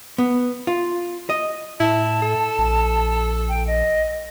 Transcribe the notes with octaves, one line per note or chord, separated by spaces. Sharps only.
B3
F4
D#5
A2 E4 A5
A4
A#1
G5
D#5